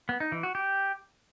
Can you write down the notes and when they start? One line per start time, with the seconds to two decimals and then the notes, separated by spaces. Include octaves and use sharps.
0.09 B3
0.20 D#4
0.32 E3
0.43 F#4
0.55 G4